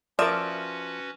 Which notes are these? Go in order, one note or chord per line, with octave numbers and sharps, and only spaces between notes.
F3 C#4 F#4 A#4 B4 D5 E5